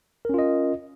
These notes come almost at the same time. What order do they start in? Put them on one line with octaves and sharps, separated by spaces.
A#4 C#4 F4 D#5